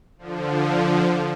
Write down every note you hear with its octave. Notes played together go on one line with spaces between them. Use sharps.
D3 F3